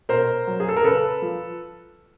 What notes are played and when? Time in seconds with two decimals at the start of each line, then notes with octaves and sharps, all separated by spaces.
0.09 B2 A#4 C5
0.47 F#3
0.60 G#4
0.69 A4
0.76 A#4
0.84 C#3 A4 B4
1.22 F3